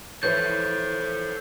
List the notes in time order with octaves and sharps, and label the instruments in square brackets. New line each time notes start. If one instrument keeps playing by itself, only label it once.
[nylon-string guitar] E3 F3 C5 [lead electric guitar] A4 C#5 [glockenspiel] G6